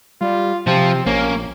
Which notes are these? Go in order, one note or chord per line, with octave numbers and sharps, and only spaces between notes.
G3 F4
C3 F3 C4 F4
A#1 A#3 C#4